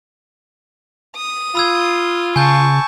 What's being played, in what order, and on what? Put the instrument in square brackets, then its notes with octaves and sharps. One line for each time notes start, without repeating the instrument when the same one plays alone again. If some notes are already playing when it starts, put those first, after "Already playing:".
[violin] D#6
[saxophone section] F4 [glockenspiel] B5 E6 G#6
[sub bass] C#3 [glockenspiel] G#5 G6 [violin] A5 C#6